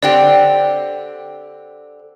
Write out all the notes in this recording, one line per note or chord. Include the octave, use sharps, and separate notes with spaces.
D3 C4 G4 D5